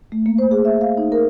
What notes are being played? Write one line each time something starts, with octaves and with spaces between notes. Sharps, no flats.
A3
A#3
C5
G#4
E5
F5
D#4
A#4